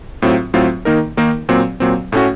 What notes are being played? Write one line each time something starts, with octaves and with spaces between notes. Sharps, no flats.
A2 F#3 C4 F4
A2 F#3 C4 F4
D#3 A#3 D#4 A#4
D#3 A#3 D#4 A#4
A#2 F#3 C4
A#2 F#3 C4
A2 A3 C#4 F#4